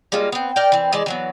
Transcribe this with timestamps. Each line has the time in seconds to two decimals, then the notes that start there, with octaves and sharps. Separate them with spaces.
0.12 G3 G#3 A#3 F4
0.32 B3 C4
0.56 A#4 D5 G5
0.72 E3 C4
0.93 E3 G#3 D5
1.06 E3 F#3 B3